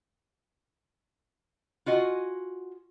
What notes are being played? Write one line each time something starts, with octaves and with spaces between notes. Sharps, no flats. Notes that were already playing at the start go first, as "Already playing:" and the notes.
F4 F#4 D#5 G#5